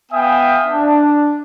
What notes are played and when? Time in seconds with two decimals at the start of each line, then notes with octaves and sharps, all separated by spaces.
0.12 B3 E5 F5 G5 G#5 D#6
0.67 D4